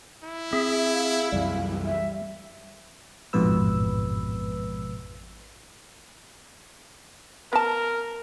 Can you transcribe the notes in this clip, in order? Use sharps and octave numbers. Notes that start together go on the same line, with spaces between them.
E4
C4 G#4 E5
F5
C2 F#2 E3 G3
E5
A1 F2 G#2 B2 B4 E6
B3 A#4 A5